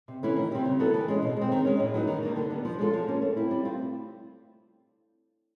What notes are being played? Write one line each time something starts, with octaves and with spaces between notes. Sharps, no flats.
C3
E3 A3 C#4 E4
D#3
G3 C4 E4 G4
C#3
F#3 B3 E4 A4
E3
G#3 C#4
B2
G#3 C4
D#3
G#3 C#4
A2
F#3 B3 D#4
D#3
G3 A#3 D4
D3
G3 B3
F3
G#3 C#4 F4 A4
F3
A#3 C#4
A3
C4 E4
G3
C4 F4